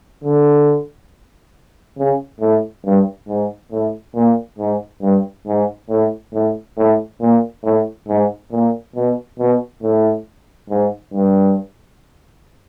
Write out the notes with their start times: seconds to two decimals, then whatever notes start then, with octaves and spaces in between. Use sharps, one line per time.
0.24 D3
1.98 C#3
2.41 A2
2.85 G2
3.28 G#2
3.72 A2
4.15 A#2
4.59 G#2
5.02 G2
5.47 G#2
5.89 A2
6.34 A2
6.78 A2
7.21 A#2
7.64 A2
8.08 G#2
8.52 A#2
8.96 B2
9.39 B2
9.83 A2
10.70 G#2
11.13 G2